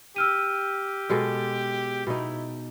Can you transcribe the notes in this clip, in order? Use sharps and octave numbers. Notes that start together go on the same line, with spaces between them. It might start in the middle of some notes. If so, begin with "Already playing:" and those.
G4 E6 F6 D#7
B2 G#3 A4
B2 D#4 E4